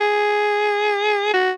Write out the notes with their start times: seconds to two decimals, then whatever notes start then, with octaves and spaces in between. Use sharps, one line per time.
0.01 G#4
1.33 F#4